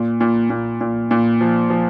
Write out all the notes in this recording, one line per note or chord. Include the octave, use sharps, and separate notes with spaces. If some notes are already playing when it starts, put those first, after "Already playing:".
Already playing: A#2
A#2
A#2
A#2
A#2
F3
F3